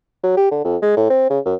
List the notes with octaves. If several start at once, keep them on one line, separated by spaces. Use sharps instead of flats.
F#3
G4
D3
F2
G#3
A2
C4
C#3
F#2